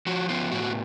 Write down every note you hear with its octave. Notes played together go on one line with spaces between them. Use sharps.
F3 F#4
B3 F4
A2 F#4